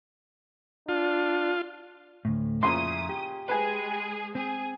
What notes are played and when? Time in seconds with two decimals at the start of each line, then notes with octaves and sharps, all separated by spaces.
0.89 D4 F4
2.25 D2 A2
2.63 F2 A#2 C#3 E4 E5 C6 D#6
3.09 G4
3.48 G#3 G#4 B4 G#5
4.35 C4 G#4